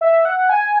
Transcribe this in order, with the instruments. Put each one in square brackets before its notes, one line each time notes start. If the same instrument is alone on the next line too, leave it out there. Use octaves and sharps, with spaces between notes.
[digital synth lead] E5
F#5
G#5